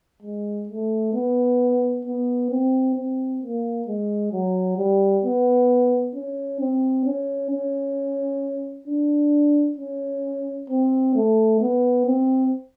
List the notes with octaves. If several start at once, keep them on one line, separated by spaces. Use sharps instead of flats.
G#3
A3
B3
B3
C4
C4
A#3
G#3
F#3
G3
B3
C#4
C4
C#4
C#4
D4
C#4
C4
A3
B3
C4